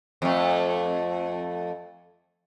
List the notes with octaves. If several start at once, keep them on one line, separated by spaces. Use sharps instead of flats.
F2 A3